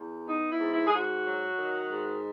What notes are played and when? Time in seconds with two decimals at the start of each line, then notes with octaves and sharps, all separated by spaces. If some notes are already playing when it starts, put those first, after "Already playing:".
Already playing: E2
0.26 B3 D#4
0.49 E4
0.60 G#2
0.71 E4
0.87 G#4
0.92 G#2 F#4
1.25 F#3
1.58 D#3
1.91 G#2